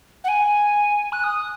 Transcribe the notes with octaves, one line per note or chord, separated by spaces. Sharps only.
F#5
G#5
F#6
D#6